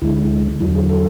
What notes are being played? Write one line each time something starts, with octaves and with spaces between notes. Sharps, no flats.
D2 D3 G#3 E4
E2 D3 F#3 E4
G#4
A4